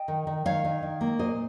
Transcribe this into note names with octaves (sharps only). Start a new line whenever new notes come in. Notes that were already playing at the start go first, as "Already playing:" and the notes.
Already playing: D#5 G5
D#3
D#3
D#3 C#5 F5
D#3
D#3
A#3
A#2 C5 D#5